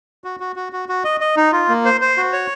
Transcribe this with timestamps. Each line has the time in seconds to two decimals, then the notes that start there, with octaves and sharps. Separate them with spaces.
0.24 F#4
0.40 F#4
0.56 F#4
0.73 F#4
0.89 F#4
1.04 D#5
1.21 D#5
1.36 D#4
1.52 F4
1.69 A#3
1.85 C5
2.01 C5
2.17 F#4
2.33 C#5